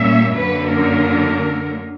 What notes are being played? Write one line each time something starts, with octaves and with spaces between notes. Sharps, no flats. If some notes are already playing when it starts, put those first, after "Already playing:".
Already playing: A#2 G3 A#3 C#4 E5
F#2 D3 F#3 A#3 C#4 B4
A#4